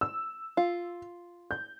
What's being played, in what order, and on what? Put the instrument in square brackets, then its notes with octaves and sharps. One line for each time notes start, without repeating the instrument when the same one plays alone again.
[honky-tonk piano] E6
[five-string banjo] F4
[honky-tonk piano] G6